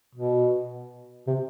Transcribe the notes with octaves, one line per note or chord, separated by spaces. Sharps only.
B2
C3